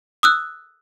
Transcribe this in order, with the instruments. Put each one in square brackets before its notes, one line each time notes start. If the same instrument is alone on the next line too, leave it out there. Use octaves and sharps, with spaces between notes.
[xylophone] D#6 E6 F#6